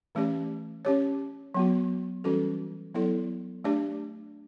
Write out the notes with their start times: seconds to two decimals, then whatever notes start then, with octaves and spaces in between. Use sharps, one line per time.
0.15 E3 A3 C#4 G4 D5
0.85 C#4 G4 C#5
1.54 F#3 B3 F#4
2.24 E3 G3 C#4 F#4 A4
2.94 F#3 B3 E4 A4 D5
3.64 A3 D4 G4 D5